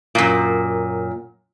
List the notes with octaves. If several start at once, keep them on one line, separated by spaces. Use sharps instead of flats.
F#2 A#2